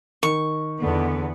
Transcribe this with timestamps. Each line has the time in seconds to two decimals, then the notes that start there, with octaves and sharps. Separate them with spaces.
0.23 D#3 C#6
0.80 E2 D3 B3